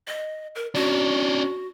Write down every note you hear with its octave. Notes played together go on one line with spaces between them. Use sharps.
D#5
A#4
C#4 D4 F#4